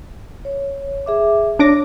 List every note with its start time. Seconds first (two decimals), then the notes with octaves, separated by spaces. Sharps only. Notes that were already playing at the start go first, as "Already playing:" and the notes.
0.45 C#5
1.06 G#4 E5 D6
1.59 D4 C#5 D6 A#6